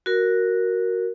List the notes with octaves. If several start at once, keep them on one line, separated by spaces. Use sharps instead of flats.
F#4 A#4